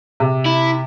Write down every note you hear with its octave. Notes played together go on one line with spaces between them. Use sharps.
C3
E4